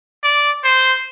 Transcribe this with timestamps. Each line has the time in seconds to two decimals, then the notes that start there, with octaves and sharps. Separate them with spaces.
0.23 D5
0.64 C5